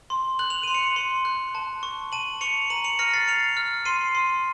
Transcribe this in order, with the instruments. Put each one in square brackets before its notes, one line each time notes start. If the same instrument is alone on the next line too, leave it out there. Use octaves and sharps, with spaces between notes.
[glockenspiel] C6
F#6 F#7
F7
C6 D#7
C#7 F7
C6
F#6
A5
C#6
A5 D#7 F#7
C#6 C#7 F7
A#5 D#7 F#7
C#7 F7
F6 A#6 C#7
A6 C7
F6 C#7 F7
F6
C6 C7 D#7
C6